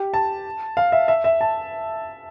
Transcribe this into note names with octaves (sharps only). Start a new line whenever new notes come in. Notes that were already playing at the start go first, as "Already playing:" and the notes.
Already playing: G4
A5
F5
E5
E5
E5
A5